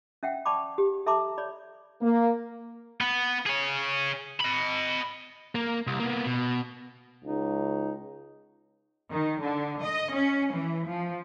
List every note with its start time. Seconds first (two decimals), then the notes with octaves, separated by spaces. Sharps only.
0.23 C#4 E5 F#5 G5
0.46 D5 G5 A5 B5 C#6 D6
0.78 G4
1.06 A4 E5 A5 A#5 C6 D6
1.37 C#5 D5 B5
2.02 A#3
3.01 B3
3.46 G#4 C#5
4.40 D#5 B5
5.55 A#3
5.87 C2
6.00 A#3 B3
6.26 B2
7.24 C#2 D#4
9.11 D#3
9.42 D3
9.84 D#5
10.15 C#4
10.53 E3
10.88 F3